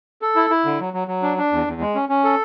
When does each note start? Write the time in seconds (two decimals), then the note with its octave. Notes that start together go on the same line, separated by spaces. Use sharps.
0.22 A4
0.36 E4
0.50 E4
0.65 D3
0.80 F#3
0.94 F#3
1.08 F#3
1.22 D4
1.38 D4
1.52 E2
1.67 E2
1.81 G#3
1.95 C#4
2.09 C#4
2.24 A4